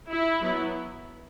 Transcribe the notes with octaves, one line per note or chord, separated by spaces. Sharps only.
E4
F#3 B3 E4